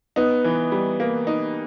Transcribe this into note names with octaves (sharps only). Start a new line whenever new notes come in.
B3 D#4
E3
G3
A#3
D#4